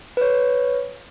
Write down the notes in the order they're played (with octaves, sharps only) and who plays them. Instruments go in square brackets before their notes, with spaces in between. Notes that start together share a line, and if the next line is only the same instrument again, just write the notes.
[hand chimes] B4 C#5